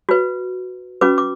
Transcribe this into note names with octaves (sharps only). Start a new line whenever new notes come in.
F#4 B4
C#4 F#4 B4 D6
D6